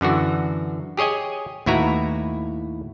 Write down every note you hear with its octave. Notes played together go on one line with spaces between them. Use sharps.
F#2 D3 E3 F#4
G4 G#4 C#5 D#5 G#5
D#2 A2 E4 F#4 B4 A#5